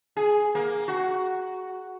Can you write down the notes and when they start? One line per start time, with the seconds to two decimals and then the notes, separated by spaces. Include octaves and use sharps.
0.17 G#4
0.55 A#3
0.88 F#4